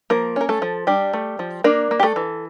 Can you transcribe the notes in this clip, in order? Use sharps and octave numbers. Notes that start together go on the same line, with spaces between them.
F3 A#3 A#4
C#4 A#4
A3 A4
F3
G3 D4 G4
A3
F3
A#3 D4 A#4
A#3
G4
A3 A4
E3